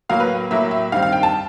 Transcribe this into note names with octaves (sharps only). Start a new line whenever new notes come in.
A2 F#3 A#3 F5
B4
A2 F#3 A#3 E5
E5
G2 D#3 G3 C4 F5
F5
G5
A5